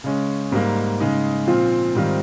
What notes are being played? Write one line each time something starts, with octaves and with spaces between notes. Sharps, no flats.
C#3 G#3 C#4
G#2 G3 A#3
C#3 G#3 D#4
A#2 F3 C4 F4
G#2 D#3 G3 C4 F4